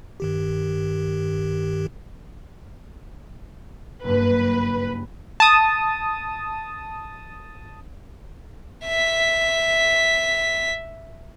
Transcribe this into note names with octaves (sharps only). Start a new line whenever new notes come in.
G2 D#3 G4
F#1 G2 A#3 B4
A5 D#6
E5 B6